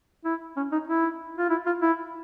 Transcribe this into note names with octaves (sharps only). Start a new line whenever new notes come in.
E4
C#4
D#4
E4
F4
E4
F4
E4